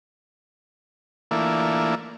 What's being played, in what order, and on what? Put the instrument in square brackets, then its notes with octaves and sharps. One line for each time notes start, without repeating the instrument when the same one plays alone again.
[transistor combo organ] E3 A3 A#3 D4 E4 F4